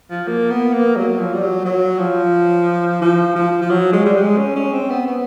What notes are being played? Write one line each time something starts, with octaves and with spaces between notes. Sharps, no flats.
F3
A#3
B3
A#3
F#3
F3
G3
F#3
F#3
F3
F3
F3
F3
F#3
G#3
G3
G#3
C#4
C#4
C4
B3
B3